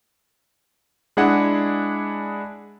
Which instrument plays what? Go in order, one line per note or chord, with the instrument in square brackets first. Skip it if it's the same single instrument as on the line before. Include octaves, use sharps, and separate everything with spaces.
[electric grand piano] G#3 D4 E4 G#4 F#5